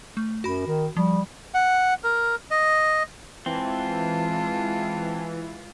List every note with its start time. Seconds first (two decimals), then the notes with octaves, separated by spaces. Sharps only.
0.17 A3
0.44 F#2 F#4 B5
0.67 D#3
0.97 F3 G3
1.54 F#5
2.04 A#4
2.51 D#5
3.46 E3 G#3 C4 F4 A5